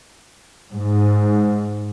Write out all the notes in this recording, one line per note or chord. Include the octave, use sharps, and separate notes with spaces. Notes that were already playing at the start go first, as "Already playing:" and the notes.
G#2